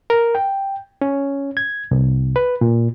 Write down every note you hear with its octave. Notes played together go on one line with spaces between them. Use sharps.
A#4
G5
C#4
G#6
C2
B4
A#2